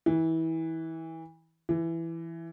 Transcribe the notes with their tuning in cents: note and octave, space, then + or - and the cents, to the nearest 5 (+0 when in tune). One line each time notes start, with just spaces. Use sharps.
E3 -25
E3 +10